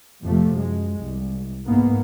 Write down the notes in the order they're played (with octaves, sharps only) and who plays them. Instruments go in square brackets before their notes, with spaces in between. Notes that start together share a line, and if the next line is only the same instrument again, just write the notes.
[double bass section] F2 C3 F3 A3
F#2 G#3
C2
G#2 A#3 B3